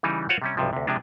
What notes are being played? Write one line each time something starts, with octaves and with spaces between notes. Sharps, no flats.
C#3 E3 G3 D#4
F4 F#4 C5 C#5 F5 F#5
C3 G3 C#4
B1 G2 C3 F3
D2 C3
C3 F3 G#3 D4